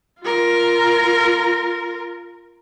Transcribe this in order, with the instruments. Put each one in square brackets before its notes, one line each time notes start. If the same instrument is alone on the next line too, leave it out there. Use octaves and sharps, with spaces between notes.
[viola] F4 A#4